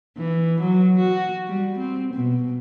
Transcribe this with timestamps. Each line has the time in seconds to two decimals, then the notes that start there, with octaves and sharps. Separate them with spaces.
0.17 E3
0.61 F#3
0.99 F#4
1.48 G3
1.78 C4
2.14 B2